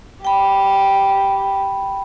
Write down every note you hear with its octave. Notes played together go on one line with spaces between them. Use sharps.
G4 G5 B5